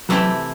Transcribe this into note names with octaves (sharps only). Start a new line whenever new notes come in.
C3 E3 F#3 A3 E4 G4